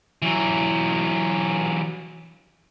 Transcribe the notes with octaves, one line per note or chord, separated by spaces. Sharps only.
E3 F#3